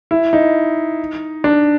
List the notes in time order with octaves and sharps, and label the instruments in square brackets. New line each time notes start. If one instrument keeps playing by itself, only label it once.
[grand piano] E4
D#4
D4